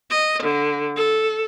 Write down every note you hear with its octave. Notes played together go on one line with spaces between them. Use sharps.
D#5
D3
A4